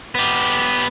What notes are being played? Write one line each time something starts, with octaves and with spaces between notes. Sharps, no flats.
B3 G4